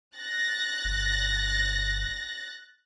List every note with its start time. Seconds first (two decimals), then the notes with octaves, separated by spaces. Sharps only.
0.16 F#6 A6 A#6
0.85 G1